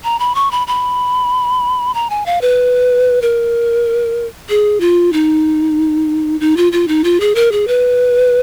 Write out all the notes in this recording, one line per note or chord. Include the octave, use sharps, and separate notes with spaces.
A#5
B5
C#6
B5
B5
A#5
G#5
F5
B4
A#4
G#4
F4
D#4
D#4
F4
F4
D#4
F4
G#4
A#4
G#4
B4